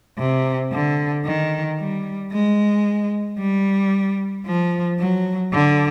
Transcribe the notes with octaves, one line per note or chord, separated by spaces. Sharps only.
C3
D3
D#3
G3
G#3
G3
F3
F#3
D3